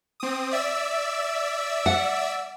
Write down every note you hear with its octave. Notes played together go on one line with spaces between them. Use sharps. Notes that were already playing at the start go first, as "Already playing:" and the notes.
C4 D#6
D5 E5 E6
F#5